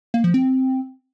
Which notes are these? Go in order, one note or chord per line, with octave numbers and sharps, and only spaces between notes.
A#3
F3
C4